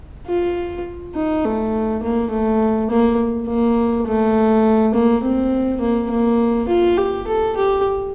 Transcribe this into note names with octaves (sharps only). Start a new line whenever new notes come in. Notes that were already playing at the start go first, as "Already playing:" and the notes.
F4
D#4
A3
A#3
A3
A#3
A#3
A3
A#3
C4
A#3
A#3
F4
G4
A4
G4